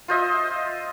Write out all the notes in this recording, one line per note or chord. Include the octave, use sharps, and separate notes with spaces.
F4 C5 D#5 E5